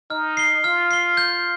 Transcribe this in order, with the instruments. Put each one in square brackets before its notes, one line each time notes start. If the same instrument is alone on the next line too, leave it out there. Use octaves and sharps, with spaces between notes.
[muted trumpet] D#4 [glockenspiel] F6
[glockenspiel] C7 G7
[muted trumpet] F4 [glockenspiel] F6
[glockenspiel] C7 G7
G6